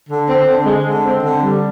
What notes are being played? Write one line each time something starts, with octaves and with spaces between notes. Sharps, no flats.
D3
C4
D3
G#3
D3
C4
D3
G3